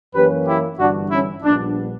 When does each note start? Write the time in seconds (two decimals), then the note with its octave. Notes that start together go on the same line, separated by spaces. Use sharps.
0.14 F#2 E3 A#3 C#4 G4 B4
0.47 E4 G4
0.79 G1 G2 E3 D4 F#4
1.12 C#4 E4
1.43 A#1 A#2 G3 B3 D4